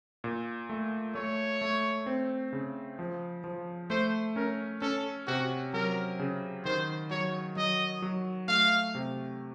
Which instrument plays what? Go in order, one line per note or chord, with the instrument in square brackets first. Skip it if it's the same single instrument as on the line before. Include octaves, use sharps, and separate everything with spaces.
[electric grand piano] A#2
A3
[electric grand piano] A3 [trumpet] C#5
[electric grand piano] A3
C4
C#3
F3
F3
[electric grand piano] A3 [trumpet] C5
[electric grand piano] C#4 [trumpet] A#4
[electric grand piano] C#4 [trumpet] A4
[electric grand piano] C3 [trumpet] F#4
[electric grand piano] F#3 [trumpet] A#4
[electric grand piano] C#3
[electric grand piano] D#3 [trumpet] C5
[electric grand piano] F#3 [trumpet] C#5
[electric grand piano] F#3 [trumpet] D#5
[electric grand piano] F#3
[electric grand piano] A3 [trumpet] F5
[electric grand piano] C3